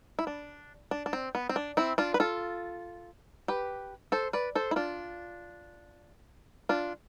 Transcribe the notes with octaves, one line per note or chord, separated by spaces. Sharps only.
E4
D4
D4
D4
C4
B3
C4
D4
C4 E4
D4 F4
B4
F4 A4
G4 B4
A4 C5
B4 D5
A4 C5
E4
D4 F4
D4 F4